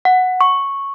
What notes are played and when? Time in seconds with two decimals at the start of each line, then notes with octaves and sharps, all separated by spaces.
0.05 F#5
0.41 C#6